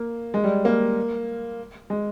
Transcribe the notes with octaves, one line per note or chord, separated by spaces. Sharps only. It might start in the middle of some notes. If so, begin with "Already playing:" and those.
Already playing: A#3
G#3
G3
A#3
G#3